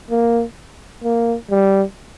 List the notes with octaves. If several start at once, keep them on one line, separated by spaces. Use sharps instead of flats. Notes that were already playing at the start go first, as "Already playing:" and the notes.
A#3
A#3
G3